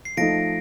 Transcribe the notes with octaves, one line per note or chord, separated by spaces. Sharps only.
C7
F3 A3 D#4 A#6 D7